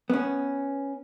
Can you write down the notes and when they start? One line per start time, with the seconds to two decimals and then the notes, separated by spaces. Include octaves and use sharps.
0.10 B3 C#4